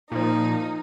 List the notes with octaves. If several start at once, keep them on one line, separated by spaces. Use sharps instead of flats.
A#2 F3 D#4